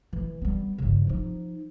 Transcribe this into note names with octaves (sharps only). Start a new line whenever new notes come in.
E3
G3 B3
G2 C#3
F3 D#4